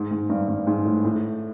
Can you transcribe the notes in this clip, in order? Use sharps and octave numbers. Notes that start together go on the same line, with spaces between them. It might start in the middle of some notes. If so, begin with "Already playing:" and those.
Already playing: G#2
G#2
G2
G2
G#2
A2
A2